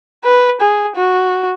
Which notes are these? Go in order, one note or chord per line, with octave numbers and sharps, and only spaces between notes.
B4
G#4
F#4